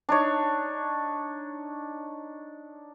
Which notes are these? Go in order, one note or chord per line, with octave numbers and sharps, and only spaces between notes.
D4 D#4 C#5